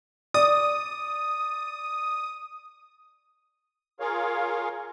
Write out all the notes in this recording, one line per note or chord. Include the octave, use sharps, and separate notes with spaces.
D5 D#6
F4 G#4 A#4 C#5 F5